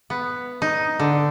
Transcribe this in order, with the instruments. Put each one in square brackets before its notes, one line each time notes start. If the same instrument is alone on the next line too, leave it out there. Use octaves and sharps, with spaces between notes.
[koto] B3
D#4
D3